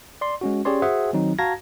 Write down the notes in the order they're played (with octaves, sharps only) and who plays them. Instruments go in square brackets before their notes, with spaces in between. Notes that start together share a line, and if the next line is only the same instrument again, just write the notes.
[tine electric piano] D5 C6
G#3 C#4 F#4
C#4 G4 G#4 C#5 D5 C6
F#4 G#4 C5 E5 F#5 G#5
D#3 F#3 C4 D#4
F#4 F5 A5 A#5 G#6 A#6